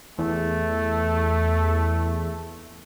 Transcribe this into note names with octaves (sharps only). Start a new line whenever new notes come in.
E2 A3